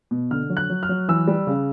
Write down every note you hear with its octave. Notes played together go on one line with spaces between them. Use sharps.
B2
D3 F6
F#3
F#6
F#3
F6
F#3
E3 E6
G3
C#3